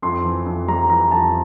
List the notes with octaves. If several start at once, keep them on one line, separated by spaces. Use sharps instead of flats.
F2 C6
E3
F2
G3 A#5
E3 A#5
F2 A5